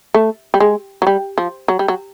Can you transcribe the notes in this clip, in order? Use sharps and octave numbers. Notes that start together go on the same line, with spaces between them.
A3
G3
G#3
F#3
G3
F3
F#3
G3
F#3